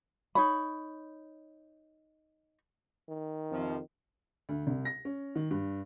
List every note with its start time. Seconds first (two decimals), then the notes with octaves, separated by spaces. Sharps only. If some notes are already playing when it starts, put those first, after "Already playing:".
0.35 D#4 C#5 B5
3.08 D#3
3.50 F2 C3 F3
4.49 D2
4.67 C2
4.85 A#6
5.05 C#4
5.36 D#3
5.51 G2